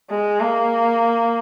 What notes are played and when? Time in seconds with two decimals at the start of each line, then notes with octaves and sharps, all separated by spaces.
0.11 G#3
0.41 A#3